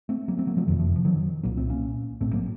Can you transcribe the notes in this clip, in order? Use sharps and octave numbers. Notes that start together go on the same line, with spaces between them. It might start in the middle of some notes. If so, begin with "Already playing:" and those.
A3 C4
F#3 A#3
A3 C4
F#3 A#3
F3 A3
F#1 F2 C3 D#3 F#3
F3
F3
D#3 F#3
C2 A#2 F#3 A#3
A3 C4
A#3 C#4
A#1 A2 A3 C4
F#3 A#3